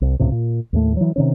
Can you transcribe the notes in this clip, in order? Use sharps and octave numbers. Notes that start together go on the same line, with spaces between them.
C2
C#2 A2 C3
A#2
D#2 A2 A3
E3 F#3
C3 D#3 C#4